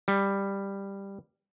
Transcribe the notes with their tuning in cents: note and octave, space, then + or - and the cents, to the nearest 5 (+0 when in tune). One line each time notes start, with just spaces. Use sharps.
G3 +10